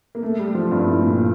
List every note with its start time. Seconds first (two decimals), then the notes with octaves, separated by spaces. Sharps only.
0.15 A#3
0.23 A3
0.39 G3
0.55 F3
0.71 G2
0.87 A2
1.03 A#2